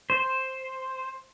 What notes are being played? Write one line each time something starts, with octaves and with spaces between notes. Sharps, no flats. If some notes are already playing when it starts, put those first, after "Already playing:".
C5